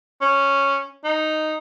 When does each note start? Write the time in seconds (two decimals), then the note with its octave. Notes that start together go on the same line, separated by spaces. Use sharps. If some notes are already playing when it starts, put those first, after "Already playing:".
0.21 C#4
1.04 D#4